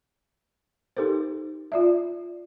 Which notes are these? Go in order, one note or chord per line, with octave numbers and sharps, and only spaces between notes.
D#4 G4 A4 A#4 C5
F4 D5 E5